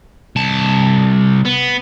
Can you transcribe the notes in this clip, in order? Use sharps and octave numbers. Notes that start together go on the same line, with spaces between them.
C2 A5
B3